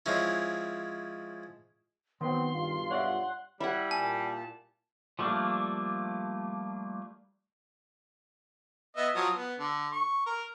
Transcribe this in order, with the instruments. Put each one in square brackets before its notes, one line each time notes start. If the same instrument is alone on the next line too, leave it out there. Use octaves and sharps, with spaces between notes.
[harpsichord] F3 G#3 C4 C#4 E4
[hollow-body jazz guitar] D#3 [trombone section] F#3 B3 C4 [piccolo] C6
[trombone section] B1 G2 F4
[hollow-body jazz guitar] C#5 D5 E5 [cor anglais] F#5
[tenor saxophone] G3 [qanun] E4 F#5
[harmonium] A#2 A5 [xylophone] G#5
[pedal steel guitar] F3 G3 A3 A#3 D4
[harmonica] B3 D#5 E5
F3 F#3 D#6
B3
D3
C#6
A#4